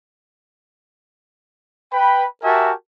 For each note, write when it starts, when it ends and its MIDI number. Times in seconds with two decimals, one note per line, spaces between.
1.93 2.25 71
1.93 2.25 79
1.93 2.25 83
2.44 2.72 66
2.44 2.72 67
2.44 2.72 70
2.44 2.72 76
2.44 2.72 80
2.44 2.72 81